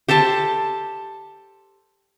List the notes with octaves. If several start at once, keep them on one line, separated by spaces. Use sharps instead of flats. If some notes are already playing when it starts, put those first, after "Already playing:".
G4 A4 C5 A5